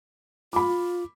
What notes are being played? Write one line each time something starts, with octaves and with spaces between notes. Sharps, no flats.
F4 B5 D6